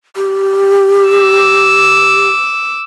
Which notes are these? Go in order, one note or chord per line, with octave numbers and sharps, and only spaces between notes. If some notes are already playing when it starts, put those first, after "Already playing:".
G4
D6 E6